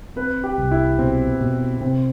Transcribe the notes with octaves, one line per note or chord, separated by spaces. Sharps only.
C4 B4
G4
C2
E4
B2 C4
B2
C3 C4